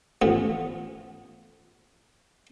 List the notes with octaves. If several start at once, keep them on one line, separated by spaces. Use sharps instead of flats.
A1 A2 F3 B3 F4